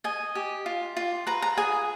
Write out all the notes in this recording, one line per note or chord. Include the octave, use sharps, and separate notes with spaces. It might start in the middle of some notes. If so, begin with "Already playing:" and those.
D#5 G#5
G4
F4
F4
B4 A#5
A#5
G#4 G#5